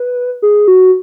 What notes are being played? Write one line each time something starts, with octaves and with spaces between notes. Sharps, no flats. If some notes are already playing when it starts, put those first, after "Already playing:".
Already playing: B4
G#4
F#4